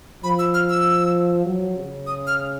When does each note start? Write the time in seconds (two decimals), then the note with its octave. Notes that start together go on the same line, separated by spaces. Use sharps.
0.24 F3 B5
0.39 E6
0.54 F6
0.69 E6
1.46 F#3
1.76 C#3
2.07 D#6
2.27 F6